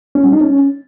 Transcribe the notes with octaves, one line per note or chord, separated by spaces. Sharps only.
C#4
G3
D#4
C#4